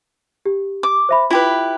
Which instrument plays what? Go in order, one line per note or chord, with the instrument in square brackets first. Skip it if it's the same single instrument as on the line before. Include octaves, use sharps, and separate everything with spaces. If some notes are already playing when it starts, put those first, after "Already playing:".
[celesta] G4
[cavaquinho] D6
[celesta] C5 E5 B5
[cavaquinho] E4 G4 B4 [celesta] F4